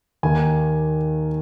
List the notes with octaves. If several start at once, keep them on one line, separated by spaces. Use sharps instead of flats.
D#2 D#3 A#3 G#5